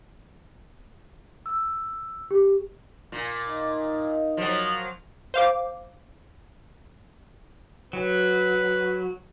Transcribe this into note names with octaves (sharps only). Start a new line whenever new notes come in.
E6
G4
A#2
D#4
F3 F#3
C5 F5 D6
F#3 B4